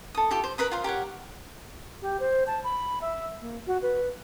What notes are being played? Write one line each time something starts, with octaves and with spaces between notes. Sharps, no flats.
A4 D#6
F4 G4 A4
C5
A#4 B4 B5 D#6
F4 A#4 C5 F5
G4 A#4 C#5 F#5
G4
C5
A5
B5
E5
A#3
F#4
B4